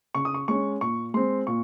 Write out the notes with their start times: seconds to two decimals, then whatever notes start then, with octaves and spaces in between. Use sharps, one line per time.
0.15 C#3 C#6
0.25 D#6
0.34 C#6
0.48 G#3 C#4 C#6
0.81 A#2 C#6
1.14 G#3 C4 C6
1.47 A#2 C#6